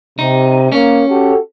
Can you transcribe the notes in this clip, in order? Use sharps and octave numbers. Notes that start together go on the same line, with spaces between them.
C3 D#4
A#3 C#4
F#4 G4 A4